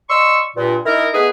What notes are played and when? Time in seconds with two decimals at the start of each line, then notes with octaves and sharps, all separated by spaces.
0.10 D5 D#5 C6 C#6 E6
0.56 G2 A#2
0.86 D#3 D#4 E4 A#4
1.14 A3 B3 D#4 G#4 B4